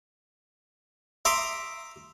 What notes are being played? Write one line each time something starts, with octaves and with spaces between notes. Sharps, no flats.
E5 A#5 C6 D6 D#6